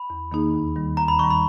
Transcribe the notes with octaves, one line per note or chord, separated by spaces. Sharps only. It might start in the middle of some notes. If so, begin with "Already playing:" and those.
Already playing: B5
E2
D#3 A#3 D#4 G#4
D#2
D#3 G3
D#2 A#5
B5
D#3 G3 C#6
B5